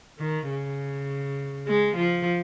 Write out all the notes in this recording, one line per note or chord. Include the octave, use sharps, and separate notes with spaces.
D#3
C#3
G#3
F3